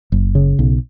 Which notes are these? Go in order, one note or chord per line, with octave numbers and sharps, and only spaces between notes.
F#1
C#3
B1